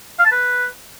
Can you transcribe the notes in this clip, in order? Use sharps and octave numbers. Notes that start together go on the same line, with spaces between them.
F5
A5
B4